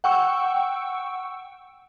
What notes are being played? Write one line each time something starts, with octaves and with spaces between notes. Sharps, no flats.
F#5 G5 C#6 E6